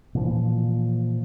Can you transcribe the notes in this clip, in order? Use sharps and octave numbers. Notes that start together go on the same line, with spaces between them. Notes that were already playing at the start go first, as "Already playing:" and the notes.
A#2 E3 F3